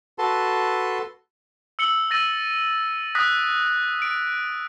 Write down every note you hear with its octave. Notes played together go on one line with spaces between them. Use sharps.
F#4 A4 B4 A5 C6
E6 C#7 F#7 G7
E6 A6 A#6 D#7
D#6 F#6 A#6 B6
D7